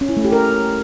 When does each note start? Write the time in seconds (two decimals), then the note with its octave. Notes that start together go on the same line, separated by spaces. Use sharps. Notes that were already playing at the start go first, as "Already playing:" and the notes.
0.01 C#4
0.09 E4
0.17 A3
0.25 G4
0.32 A#4